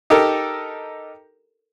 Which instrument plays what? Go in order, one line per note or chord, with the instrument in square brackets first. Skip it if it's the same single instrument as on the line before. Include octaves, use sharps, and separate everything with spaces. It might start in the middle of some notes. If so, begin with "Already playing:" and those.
[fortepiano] D#4 G4 A4 A#4